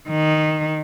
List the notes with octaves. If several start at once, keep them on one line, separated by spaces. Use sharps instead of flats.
D#3